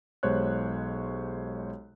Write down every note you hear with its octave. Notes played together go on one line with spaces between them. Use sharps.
B1 G#3 G4 C5 C#5 F#6